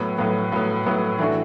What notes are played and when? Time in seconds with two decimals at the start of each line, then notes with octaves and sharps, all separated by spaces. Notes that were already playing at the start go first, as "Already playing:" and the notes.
Already playing: A2 F#3 B3
0.18 A2 F#3 B3
0.52 A2 F#3 B3
0.86 A2 F#3 B3
1.19 E3 A3 D4 F#4